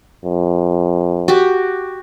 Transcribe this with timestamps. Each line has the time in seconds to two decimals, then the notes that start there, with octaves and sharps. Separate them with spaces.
0.25 F2
1.28 F#4 G4